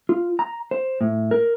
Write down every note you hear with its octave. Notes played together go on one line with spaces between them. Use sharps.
F4
A#5
C5
A2
A#4